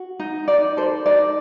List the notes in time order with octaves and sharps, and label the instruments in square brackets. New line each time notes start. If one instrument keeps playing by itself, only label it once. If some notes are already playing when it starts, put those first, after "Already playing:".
Already playing: [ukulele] F#4
D#4
D#4 D5
A4 C5
D#4 D5